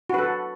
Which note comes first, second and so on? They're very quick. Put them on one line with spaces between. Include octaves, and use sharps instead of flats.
F#4 B4 A4